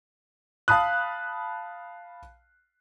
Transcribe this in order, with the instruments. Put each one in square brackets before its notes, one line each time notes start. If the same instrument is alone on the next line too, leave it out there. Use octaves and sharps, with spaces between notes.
[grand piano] F5 A5 B5 D#6 F#6